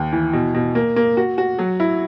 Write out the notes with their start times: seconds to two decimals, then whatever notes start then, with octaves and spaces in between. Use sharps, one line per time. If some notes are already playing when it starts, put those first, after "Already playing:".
Already playing: D#2
0.12 E3
0.33 B2
0.55 B2
0.75 A#3
0.96 A#3
1.17 F#4
1.38 F#4
1.59 F#3
1.80 E4